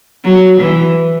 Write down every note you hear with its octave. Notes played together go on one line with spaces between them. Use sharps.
F#3
E3